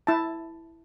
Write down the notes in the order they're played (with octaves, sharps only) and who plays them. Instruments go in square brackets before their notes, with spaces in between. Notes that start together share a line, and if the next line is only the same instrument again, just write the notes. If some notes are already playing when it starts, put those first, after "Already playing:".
[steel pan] E4 A5